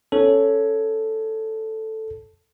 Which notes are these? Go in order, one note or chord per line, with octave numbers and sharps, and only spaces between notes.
C#4 A4